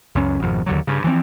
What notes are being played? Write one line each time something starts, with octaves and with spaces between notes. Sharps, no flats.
C#2 F#2 C#4
G#1 F2 B2
D#2 D3 F#3
G2 C#3
E3 F3 G3 C4